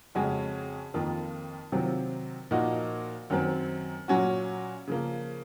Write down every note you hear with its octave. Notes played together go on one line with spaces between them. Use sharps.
F2 C#3 G#3 C#4 F#4
F2 D#3 A#3 F4
C3 D#3 F#3 C4 F4
A#2 F3 A#3 D#4 F#4
F#2 D#3 F#3 C4
A#2 F#3 C#4 F#4
C#3 F3 A#3